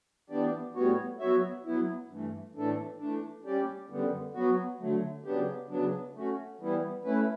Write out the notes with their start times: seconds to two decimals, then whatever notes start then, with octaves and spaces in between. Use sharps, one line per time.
0.30 E3 B3 D4 G4 D5
0.75 A2 G3 B3 F#4 C#5
1.20 F#3 B3 F#4 C#5 E5
1.65 F#3 B3 E4
2.09 G2 E3 A3
2.55 A2 E3 A3 D4 A4
2.99 E3 A3 D4
3.44 G3 C#4 G4 D5
3.89 F#2 D3 G3 B3
4.34 F#3 B3 F#4
4.80 D3 F#3 A3
5.24 C#3 F#3 B3 D4 G4
5.69 C#3 F#3 B3 D4
6.14 A3 C#4 F#4
6.60 E3 G3 B3 E4
7.04 A3 C#4 E4 B4